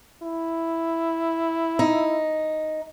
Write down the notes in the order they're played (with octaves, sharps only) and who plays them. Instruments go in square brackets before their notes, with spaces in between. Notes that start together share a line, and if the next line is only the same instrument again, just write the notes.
[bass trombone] E4
[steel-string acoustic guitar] D#4